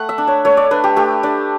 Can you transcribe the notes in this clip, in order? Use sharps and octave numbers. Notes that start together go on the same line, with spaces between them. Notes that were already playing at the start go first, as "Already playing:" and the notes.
Already playing: A3 F#5
E5
D4
C#5
A3 C#5
D5
D4 B4
G4
A3 G4
D4 D5